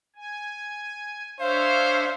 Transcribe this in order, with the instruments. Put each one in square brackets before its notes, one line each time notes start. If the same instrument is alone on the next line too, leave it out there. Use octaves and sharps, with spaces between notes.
[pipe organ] G#5
[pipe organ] D4 C#5 E5 [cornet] C5 [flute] F5